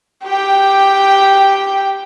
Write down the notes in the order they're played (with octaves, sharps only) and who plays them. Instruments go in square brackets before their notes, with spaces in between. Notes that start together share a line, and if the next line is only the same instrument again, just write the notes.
[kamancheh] G4 G5